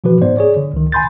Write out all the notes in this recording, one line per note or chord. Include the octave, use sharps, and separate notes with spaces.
B2 E3 F3 F#4 B4
G#2 B3 C5 D5
G#4 C#5 D5
D3
C#2 D#3
G#5 B5 C6 G6 A6